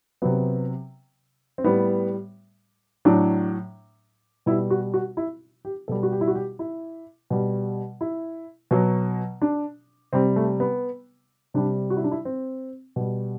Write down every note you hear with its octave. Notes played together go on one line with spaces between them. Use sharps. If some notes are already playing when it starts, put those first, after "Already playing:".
C3 F#3 B3
C4
A2 G3 B3
A2 F#3 D4
B2 G3 E4
F#4
F#4
E4
G4
B2 G3 A4
F#4
G4
E4
F#4
G4
E4
B2 G3
E4
B2 F#3
D4
C3 G3 C4
A3
B3
C3 G3 D4
F#4
E4
D4
E4
C4
B2 G3